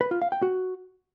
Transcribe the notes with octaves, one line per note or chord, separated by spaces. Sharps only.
B4
F4
F5
G5
F#4